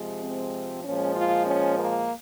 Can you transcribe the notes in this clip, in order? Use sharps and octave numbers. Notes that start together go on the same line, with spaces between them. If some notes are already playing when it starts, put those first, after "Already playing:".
Already playing: C3 F3 G#3
C4
A#2 F3 G#3 C#4
F4
C#4
A#3